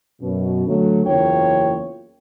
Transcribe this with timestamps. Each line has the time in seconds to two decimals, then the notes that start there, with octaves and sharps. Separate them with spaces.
0.21 F#2 B2
0.67 D3 F#3 A3
1.05 F#1 E2 A#3 F4 C#5 G5